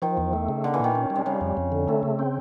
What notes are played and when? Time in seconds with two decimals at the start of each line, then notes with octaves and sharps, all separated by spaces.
0.02 D#3 F3
0.17 E2
0.33 A3
0.49 C#3
0.64 D3 A#3
0.74 E3
0.79 A#2 D#3
0.95 C#4
1.10 G3
1.16 C3
1.26 C#3 G3
1.41 F2
1.57 F2
1.72 D3
1.88 C3 A3
2.03 C#3
2.19 C4